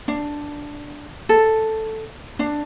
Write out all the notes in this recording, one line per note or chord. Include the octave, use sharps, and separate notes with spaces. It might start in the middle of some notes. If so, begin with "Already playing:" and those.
D4
A4
D4